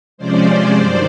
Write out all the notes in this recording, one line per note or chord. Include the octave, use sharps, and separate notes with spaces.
C3 F3 G#3 C#4 C5 D5
G2 D#3 F#3 C5 D5